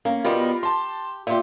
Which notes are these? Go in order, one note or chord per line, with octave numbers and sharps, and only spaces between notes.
A#3 C#4
B2 G3 B3 F4 G4 A#4
G4 A5 C6
A#2 G4 E5 C6